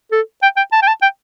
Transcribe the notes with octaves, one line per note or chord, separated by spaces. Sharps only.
A4
G5
G5
A5
G5
A5
G5